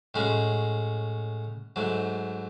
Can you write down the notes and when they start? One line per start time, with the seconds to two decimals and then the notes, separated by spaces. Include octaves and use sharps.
0.14 A2 G#3 C#4 F#4
1.76 G#2 F#3 A3